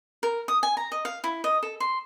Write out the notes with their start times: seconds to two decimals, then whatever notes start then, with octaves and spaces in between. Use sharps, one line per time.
0.23 A#4
0.48 D#6
0.63 G#5
0.77 A#5
0.92 D#5
1.05 F5
1.24 E4
1.44 D#5
1.63 A4
1.80 C6